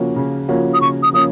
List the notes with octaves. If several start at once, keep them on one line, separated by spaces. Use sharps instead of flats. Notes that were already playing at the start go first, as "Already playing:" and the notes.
Already playing: C#3 F3 A#3 C#4 F#4
C#3
F3 A#3 C#4 F#4
D#6
C#3 C#6
D#6
F3 A#3 C#4 D#6